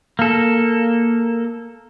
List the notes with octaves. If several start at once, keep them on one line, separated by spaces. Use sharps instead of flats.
A#3 A4